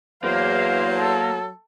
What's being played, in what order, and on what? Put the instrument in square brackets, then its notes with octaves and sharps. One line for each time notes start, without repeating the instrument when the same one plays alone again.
[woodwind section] E2 C5 [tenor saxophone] F#3 [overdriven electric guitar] A#3 [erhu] F5
[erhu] A4